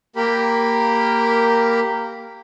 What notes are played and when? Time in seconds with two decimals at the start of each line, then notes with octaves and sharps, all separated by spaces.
0.16 A#3 G4 A#4 B5